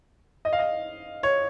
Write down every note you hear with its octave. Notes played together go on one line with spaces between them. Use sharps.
D#5
F5
D#5
C#5